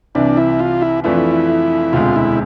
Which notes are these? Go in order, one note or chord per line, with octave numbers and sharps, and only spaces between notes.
C2 C3 E3 D4
E4
F4
E4
F2 E3 A3 D4 E4 F4
E1 D2 C3 G#3 F4
E4